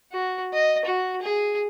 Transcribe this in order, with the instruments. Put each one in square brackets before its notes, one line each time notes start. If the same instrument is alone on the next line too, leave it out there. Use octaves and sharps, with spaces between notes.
[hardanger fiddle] F#4
D#5
F#4
G#4